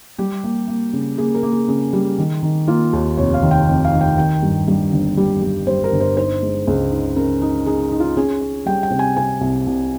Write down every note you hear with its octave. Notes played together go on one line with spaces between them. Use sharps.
G3 G4
A#3
A#3
C#3
A#3 G#4
A#4
A#3
G#4
C#3 G#4
G3
D#3
D#3
A#3 F4
D#2
F1 C#5
F5
D#3
G5
F1
F5
D#3
G5
D#3 G5
G2
G2
G1
G3
G3
G3 C5
A#4
G1
C5
D#4 C5
G#3
C#2
D#4
C#3 A#4
D#4
D#4 G#4
D#4
F4
C#4 G#4
C#4
G3 G5
G5
C3
G#5
C3 G#5
C2
C2